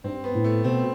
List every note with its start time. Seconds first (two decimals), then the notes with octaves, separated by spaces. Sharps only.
0.04 G2 C4
0.24 B3
0.34 A2
0.44 A3
0.64 B2 C4